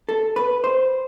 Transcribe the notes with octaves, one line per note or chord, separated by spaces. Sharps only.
A4
B4
C5